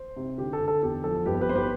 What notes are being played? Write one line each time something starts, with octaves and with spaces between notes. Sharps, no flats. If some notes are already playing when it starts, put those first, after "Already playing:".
Already playing: C5
C3
D3 G4
A4
D3
A4
E2 G4
F3 A4
G1 G4 B4
G4 B4
G1 C5
G4 B4